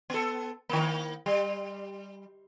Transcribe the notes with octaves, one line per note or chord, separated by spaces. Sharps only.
B3 A4
D#3 A#3
G3